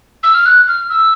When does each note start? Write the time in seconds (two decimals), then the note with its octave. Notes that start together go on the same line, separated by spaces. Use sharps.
0.23 E6
0.35 F6
0.46 F#6
0.68 F6
0.90 E6